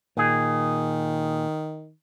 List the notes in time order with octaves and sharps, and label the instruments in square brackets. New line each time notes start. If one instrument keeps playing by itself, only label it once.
[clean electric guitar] A#2 G#4 [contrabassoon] D#3